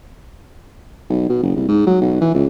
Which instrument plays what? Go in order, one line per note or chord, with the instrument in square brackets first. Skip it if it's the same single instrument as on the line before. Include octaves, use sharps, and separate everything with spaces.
[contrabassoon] B1
B2
F#1
C2
G#2
F#3
B1
E3
C#2